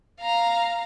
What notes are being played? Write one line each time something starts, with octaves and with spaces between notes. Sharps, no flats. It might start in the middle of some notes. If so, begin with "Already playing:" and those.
F5 A#5